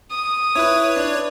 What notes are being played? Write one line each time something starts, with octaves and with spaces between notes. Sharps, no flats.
D#6
E4 B4 C#5
D4